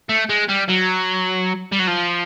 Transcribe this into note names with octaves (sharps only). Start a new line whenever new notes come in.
A3
G#3
G3
F#3
G3
F#3
F3